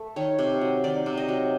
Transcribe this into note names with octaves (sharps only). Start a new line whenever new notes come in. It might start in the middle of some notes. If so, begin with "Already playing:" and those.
Already playing: A3
D#3 C#5
C3
F#3
D#3 D5
C3
D#5
F#3